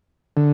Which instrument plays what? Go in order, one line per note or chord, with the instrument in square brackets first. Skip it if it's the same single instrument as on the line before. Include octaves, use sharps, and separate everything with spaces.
[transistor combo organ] D3